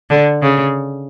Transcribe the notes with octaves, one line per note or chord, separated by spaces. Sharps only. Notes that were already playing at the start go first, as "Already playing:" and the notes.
D3
C#3